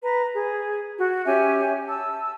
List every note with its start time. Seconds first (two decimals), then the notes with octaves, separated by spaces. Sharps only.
0.04 B4 A#5
0.33 G#4
0.99 F#4
1.26 C#4 G4 E5 G#5
1.87 A5 E6